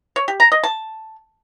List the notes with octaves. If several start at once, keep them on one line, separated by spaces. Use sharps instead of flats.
C#5
G4
A#5
D#5
A5